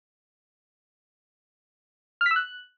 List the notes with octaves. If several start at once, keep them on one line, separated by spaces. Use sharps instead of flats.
F6
B6
E6
F#6